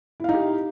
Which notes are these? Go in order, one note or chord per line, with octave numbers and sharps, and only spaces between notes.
D#4 E4 G4 F5